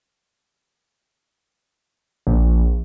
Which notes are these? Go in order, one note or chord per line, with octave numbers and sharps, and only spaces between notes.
A#1